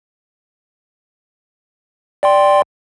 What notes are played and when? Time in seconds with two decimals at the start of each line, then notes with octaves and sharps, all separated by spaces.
2.23 D5 G5 C6